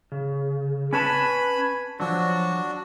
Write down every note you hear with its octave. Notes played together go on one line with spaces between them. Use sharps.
C#3
C#4 B4 G#5 A5 B5
F3 F#3 D4 F#4